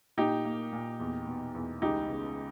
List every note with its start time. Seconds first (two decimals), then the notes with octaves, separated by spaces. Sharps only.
0.17 A#2 D#4 G4
0.45 A#3
0.72 A#2
0.99 E2
1.27 B2
1.54 E2
1.82 C#2 D#4 G4
2.09 C#3